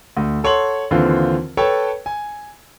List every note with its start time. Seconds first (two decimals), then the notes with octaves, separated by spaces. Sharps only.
0.17 D2
0.44 A4 C#5 F#5 C6 F#7
0.91 D#2 D3 E3 C4 F4 C5
1.57 A4 B4 C#5 G5 A5
2.06 G#5